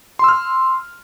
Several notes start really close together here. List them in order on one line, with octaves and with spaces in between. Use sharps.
C6 E6 F6